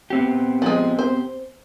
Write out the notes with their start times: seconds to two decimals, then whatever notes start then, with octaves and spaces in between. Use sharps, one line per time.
0.10 B3 C4 G4
0.62 F3 G#3
0.99 C5